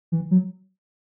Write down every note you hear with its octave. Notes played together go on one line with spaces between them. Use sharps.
E3
F#3